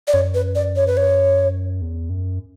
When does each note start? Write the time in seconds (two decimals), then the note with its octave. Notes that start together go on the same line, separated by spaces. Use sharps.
0.08 D5
0.13 F#2 C#5
0.34 B4
0.55 D5
0.76 C#5
0.87 B4
0.97 C#5
1.81 E2
2.09 F#2